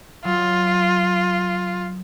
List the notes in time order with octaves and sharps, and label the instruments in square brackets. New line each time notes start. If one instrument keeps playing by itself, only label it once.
[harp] F#3 [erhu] F4